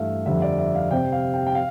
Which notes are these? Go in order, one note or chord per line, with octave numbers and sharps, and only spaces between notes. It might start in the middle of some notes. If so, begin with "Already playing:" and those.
Already playing: G2 E3 A3 E5 F5
F2 D3 G3 E5
D5
E5
F5
C3 G3 C4 G5
F5
G5
G5
F5